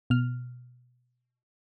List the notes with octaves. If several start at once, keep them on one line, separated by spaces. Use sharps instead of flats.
B2 F6